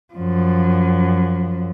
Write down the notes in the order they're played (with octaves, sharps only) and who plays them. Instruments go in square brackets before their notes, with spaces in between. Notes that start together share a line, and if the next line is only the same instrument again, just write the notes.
[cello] F#2 F3